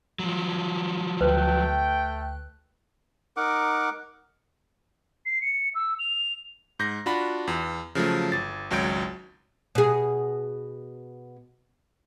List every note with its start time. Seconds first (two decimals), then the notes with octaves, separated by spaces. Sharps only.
0.19 F3 F#3
1.21 D2 A3 B4 G5 F#6
3.37 D#4 A#4 F#5 D6
5.26 C7
5.41 C#7
5.75 E6
5.99 F7
6.79 G#2 G6 A#6
7.06 D4 F4 F#4 B5
7.47 E2
7.95 C#3 F3 F#3 A3
8.32 G1 A6
8.70 G#1 C#2 F#3 C#5 G6 D7
9.75 B2 G#4